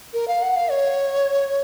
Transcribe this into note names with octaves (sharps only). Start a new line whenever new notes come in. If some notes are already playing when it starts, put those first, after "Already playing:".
A#4
F5
F#5
F5
C#5